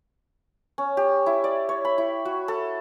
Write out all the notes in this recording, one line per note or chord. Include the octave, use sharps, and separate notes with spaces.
C#4
G4
E4
D5
C#5
B5
E4
F#4
A4